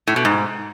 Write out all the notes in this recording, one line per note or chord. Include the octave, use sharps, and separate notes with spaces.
A2
B2
G#2